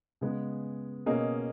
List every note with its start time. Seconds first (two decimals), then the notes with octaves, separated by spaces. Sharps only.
0.21 C#3 G#3 B3
1.06 B2 A#3 C#4 G#4 D#5